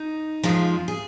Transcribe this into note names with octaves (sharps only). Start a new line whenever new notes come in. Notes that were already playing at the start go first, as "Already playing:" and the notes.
Already playing: D#4
F2 F3 G#3
G#4